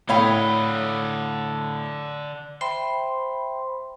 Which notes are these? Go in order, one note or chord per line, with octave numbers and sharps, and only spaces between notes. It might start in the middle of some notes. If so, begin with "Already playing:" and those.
A2 D3 E4 C#5 D#5 F5 G5 B5
C5 E5 G5 B5 C6